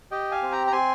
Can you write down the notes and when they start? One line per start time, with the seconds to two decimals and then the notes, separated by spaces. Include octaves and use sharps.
0.11 G4 D#5 G5
0.31 F5 G#5
0.42 C4
0.52 G5 A#5
0.67 A#5
0.72 C4 G#5 C6